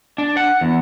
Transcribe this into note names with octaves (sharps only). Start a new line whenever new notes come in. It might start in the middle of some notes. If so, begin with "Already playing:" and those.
D4
F#5
E2